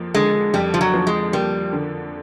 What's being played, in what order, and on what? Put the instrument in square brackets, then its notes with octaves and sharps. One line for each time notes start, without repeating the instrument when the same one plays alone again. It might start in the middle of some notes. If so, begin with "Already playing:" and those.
Already playing: [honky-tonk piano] F2 F3 A#3
[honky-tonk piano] D3 [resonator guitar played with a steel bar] G#3
[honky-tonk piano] F2 [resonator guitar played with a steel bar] G3
[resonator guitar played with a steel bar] F3
F#3
[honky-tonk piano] F3
[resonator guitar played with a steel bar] G#3
[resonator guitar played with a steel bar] G3 [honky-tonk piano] A#3
[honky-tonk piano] D3